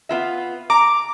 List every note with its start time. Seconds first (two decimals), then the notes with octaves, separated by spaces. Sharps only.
0.09 B3 F4 E5
0.70 A#5 D6